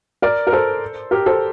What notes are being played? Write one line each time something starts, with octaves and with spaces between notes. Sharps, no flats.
A#4 D5
A#4
A4 C5
G4 A#4
A4 C5